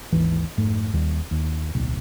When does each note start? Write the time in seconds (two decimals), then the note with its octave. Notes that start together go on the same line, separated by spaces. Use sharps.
0.12 G#1 D#2 E3
0.57 F1 G#2 A3
0.93 D#2 G3
1.31 D#2
1.75 D1 B1